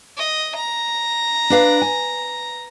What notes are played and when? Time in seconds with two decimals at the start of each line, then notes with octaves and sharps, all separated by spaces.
0.18 D#5
0.56 A#5
1.50 D4 B4 F5
1.82 G#5